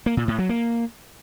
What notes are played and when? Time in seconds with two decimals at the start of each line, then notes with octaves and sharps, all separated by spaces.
0.06 A#3
0.17 A#2
0.28 A2
0.39 F#3
0.49 A#3